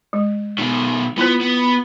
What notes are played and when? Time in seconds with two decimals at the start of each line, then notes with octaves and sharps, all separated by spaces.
0.13 G#3
0.58 B2 D#3
1.18 B3 E4 F4 C5
1.41 B3